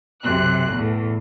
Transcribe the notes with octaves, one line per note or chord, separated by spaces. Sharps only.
B1 F#2 C3 F#6
E2 A2